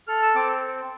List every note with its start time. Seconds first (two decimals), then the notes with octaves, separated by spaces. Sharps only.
0.08 A4 F6
0.22 E6
0.35 C4 D6